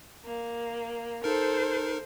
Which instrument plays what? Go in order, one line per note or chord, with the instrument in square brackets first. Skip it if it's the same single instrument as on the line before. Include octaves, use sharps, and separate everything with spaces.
[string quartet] A#3
[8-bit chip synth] D#4 A#4 [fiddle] A4 [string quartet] C5